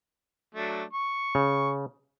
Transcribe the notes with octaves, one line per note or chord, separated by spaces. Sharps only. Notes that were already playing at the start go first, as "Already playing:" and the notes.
F#3 A3 D4
C#6
C#3